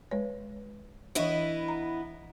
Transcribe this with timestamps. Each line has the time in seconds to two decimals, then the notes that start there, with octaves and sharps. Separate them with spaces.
0.11 G#3 B4 C#5
1.15 E3 B3 D4 E4 D#5
1.68 A#5